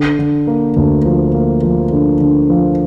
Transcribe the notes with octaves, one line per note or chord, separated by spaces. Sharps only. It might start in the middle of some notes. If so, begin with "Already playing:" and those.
Already playing: D3
D3
A#3
D2
F3
A#3
F3
D3
D3
F3